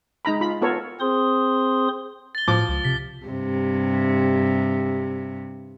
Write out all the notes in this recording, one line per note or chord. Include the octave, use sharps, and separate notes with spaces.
G#3 D#4 A#5 B5
F4 B5
B3 F4 A4 A#4 C#5
C4 G#4 C5 C6 D#6
A6 G7
A2 F3 D6
C#2
C3 B6
G2 C3